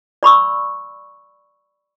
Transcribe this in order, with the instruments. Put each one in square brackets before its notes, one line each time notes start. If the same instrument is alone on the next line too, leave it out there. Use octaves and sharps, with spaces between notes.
[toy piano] D5 B5 C#6 E6